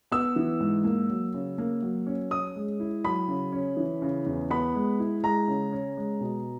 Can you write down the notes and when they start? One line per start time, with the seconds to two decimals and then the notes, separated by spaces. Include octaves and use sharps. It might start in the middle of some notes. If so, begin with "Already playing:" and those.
0.12 B3 E6
0.36 E3
0.60 G#2
0.84 A#3
1.10 F#3
1.34 C#3
1.58 A#3
1.82 F#3
2.06 C#4
2.31 C#4 D#6
2.56 G#3
2.80 E4
3.04 F#3 B5
3.28 C#3
3.52 C#4
3.77 E3
4.02 C#3
4.26 E2
4.50 B3 B5
4.75 G#3
4.99 E4
5.24 G#3 A#5
5.48 C#3
5.72 C#4
5.97 G#3
6.21 B2